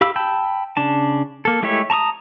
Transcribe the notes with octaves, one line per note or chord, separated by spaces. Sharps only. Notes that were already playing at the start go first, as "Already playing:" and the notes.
G4 F5 B5 E6
G5 A5 B5 E6 G6
C#3 D4 A5
A#3 A4
G#3 A3 E4 G4 C#5
A5 A#5 C#6 D#6